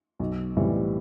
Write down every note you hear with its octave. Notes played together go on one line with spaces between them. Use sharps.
B1
A2 E3 G3 C4